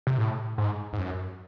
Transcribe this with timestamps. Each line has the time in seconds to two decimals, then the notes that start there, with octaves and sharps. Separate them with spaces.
0.07 C3
0.18 A2
0.58 G#2
0.93 G#2
0.98 F#2